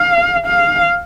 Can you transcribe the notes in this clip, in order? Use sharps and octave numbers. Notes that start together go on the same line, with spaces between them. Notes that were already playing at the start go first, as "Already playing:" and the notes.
Already playing: F5
F5